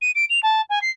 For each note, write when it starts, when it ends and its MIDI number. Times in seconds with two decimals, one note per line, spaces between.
0.01 0.11 99
0.15 0.25 98
0.30 0.40 101
0.43 0.62 81
0.70 0.79 80
0.82 0.90 96